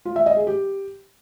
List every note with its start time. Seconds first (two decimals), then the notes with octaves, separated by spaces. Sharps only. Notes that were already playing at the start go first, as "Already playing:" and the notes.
0.05 F4
0.16 E5
0.26 D#5
0.37 G#4
0.47 G4